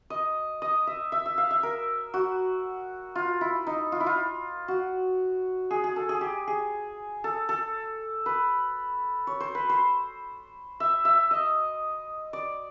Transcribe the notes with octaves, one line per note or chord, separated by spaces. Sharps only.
D#5
D#5
E5
E5
E5
F5
E5
A#4
F#4
F4
E4
D#4
F4
E4
F4
F#4
G#4
G#4
A4
G#4
G4
G#4
A4
A4
B4
C#5
C5
B4
C5
E5
E5
D#5
D5